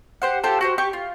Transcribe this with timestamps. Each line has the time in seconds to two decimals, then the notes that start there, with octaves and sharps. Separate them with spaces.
0.22 G4 C5 F#5
0.44 F4 G4 A4 C5
0.61 F#4 G4 C5
0.78 G4 C#6
0.93 F4